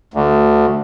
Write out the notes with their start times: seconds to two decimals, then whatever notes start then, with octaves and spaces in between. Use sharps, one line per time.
0.14 D2